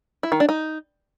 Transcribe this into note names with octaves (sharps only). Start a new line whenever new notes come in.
E4
D#3
D4
D#4